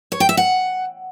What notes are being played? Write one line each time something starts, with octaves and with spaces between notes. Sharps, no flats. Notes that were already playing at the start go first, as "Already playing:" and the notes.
C#5
G5
E5
F#5